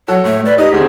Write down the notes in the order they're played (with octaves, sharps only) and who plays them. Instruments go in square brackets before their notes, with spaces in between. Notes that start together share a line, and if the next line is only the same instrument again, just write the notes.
[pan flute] F#3 [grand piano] F#4 A4 [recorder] C#5
[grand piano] A2 [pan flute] A3
[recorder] B4 [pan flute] D5
[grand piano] D#4 [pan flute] G4 [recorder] D#5
[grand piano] D2 D#3 C4 [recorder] G#4